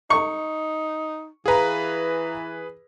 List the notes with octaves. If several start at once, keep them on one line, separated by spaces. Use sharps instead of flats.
D#4 C#6
E3 G#4 B4 F5 A#5